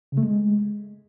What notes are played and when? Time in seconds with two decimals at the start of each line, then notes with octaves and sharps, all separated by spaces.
0.12 C#3
0.18 A3
0.23 G#3